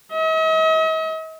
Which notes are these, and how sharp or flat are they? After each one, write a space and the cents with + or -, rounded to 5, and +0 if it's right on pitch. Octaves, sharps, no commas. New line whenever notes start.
D#5 +45